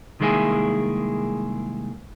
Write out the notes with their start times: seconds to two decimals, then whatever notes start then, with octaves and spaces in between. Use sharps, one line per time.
0.20 C2 D#3 G#3 A#3 E4 G#4